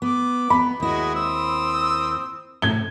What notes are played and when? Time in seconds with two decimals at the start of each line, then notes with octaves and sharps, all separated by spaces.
0.02 B3 D6
0.50 B3 B5
0.80 D#2 G#3 E4 F#4 D#5
1.15 C4 D#6 E6
2.62 A2 C3 G#6 G7